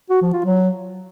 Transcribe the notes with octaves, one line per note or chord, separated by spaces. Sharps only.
F#4
F3
F4
F#3